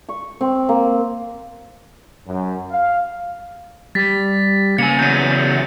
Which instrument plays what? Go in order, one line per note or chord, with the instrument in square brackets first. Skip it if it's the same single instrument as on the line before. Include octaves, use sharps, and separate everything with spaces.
[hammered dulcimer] C#6
C4
A#3
[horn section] F#2
F5
[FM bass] G3 [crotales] A6 B6
[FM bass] C#3 [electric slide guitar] A#3 G#5 [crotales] C#7
[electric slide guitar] E2 F#3 [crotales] G6 D#7